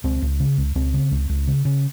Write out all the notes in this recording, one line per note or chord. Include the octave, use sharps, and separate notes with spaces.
C#2 C4
C#2
C#3
C#2
C#2 C4
C#3
C#2
C#2
C#3
C#3